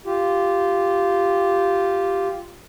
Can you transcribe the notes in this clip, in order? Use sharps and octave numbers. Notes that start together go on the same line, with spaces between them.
F4 G4